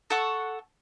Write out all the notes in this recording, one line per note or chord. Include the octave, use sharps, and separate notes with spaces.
A4 F#5 C#6